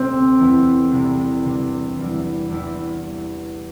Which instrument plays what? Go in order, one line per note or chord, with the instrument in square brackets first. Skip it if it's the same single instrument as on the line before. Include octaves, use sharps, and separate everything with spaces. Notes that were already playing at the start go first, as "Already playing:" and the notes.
Already playing: [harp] D2 C3 A3 [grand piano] C4
[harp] E2 E3 A3 E4
C2 C3 E3
C3 G3 D4
E2 E3 G3
E2 E3 G3 C4 E4